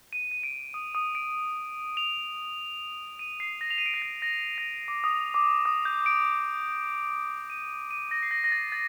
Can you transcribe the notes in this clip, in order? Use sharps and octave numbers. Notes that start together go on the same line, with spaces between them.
D#7
D#7
D7
D#6
D#6
D7
F7
D#7
C7
A#6
F7
D#7
D7
C7
A#6
A#6
A#6
D6
D#6
D6
D#6
G6
D7
D#7
D#7
A#6
C7
A#6
A#6
A6
A6